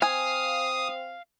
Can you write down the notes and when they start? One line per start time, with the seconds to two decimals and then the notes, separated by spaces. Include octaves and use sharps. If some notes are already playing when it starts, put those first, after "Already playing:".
0.02 C4 F5 G#5 D#6